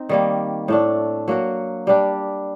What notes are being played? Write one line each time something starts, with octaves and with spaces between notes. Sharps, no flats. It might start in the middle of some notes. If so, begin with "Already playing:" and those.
Already playing: C4 D#4
D#3 G3 A#3
A2 A3 D4
F#3 A#3 F#4
G3 D4 G4